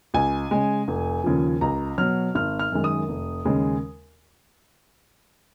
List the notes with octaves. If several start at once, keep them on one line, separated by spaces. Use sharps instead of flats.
C#2 G#5
C#3 G#3
F1
D#2 C#3 F3
C#2 A#5
B2 F#3 F6
G#1 F6
F6
F#2 D#3 G#3
D#6
F1
D#2 C#3 G#3